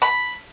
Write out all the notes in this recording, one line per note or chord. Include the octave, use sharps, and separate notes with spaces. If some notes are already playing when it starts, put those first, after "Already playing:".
B5